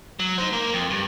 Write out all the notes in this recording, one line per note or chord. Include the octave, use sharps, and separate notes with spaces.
F#3
D#4 C5
A#3 A#4
F2
G2